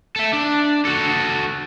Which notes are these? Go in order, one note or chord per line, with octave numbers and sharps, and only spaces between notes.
A4 E5
D4
F#4 A4